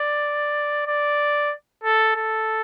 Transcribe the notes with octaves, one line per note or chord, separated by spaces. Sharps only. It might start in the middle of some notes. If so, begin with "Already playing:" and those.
Already playing: D5
D5
A4
A4